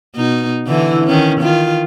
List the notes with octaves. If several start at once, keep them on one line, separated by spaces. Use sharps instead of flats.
B2 D#4
D3 E3 E4
D#3 C#4
D#3 F4